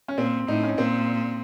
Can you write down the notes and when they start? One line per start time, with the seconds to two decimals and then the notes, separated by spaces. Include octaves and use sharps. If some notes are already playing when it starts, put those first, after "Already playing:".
0.08 C#4
0.18 A#2 C4
0.48 A2 D#4
0.63 C#4
0.78 A#2 C4